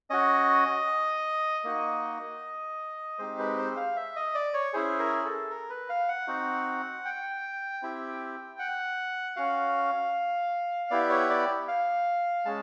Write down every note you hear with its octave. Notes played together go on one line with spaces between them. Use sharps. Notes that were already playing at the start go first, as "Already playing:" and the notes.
C#4 F#4 D#5
A#3 D#4 F#4
G#3 C4 D#4 G4 C5
B4
C5
F5
E5
D#5
D5
C#5
C#4 E4 G#4 C5
A#4
A4
A#4
B4
F5
F#5
C4 D#4 F#4
G5
C4 E4 G4
F#5
C#4 F#4 F5
B3 E4 G4 D5
C#5
D5
F5
G#3 C#4 A5